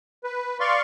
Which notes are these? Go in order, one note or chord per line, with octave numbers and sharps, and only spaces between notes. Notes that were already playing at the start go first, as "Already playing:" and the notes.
B4
D5 F5 C6 C#6